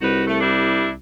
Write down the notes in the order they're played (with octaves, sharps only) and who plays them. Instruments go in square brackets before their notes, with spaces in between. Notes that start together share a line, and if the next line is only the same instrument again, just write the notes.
[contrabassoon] C2 [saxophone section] D#4 F#4 B4
[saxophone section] A3
G3 D4 E4